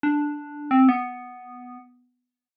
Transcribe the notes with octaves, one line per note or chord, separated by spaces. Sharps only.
D4
C4
B3